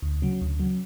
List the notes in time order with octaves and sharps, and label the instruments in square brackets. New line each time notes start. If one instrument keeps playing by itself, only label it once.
[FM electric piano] D2
C#3 F#3
D2
C#3 F#3